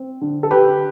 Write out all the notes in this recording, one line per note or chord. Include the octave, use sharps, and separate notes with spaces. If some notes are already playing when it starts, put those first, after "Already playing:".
Already playing: C4
D3
A4
D3 G4 B4